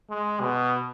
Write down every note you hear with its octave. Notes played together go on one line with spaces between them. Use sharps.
G#3
B2